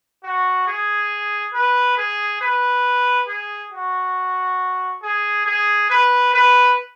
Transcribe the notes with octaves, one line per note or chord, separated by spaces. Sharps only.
F#4
G#4
B4
G#4
B4
G#4
F#4
G#4
G#4
B4
B4